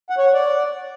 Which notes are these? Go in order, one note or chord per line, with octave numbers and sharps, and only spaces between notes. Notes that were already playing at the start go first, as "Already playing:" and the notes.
F#5
C#5
F#5
D5